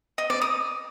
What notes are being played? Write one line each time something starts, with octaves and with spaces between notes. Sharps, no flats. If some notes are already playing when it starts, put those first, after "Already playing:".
D#5
D5
D#6